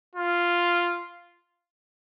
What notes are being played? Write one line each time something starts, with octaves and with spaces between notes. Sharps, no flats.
F4